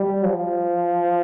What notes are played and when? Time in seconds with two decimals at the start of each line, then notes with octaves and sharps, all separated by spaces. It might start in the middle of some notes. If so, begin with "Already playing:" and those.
Already playing: G3
0.25 F3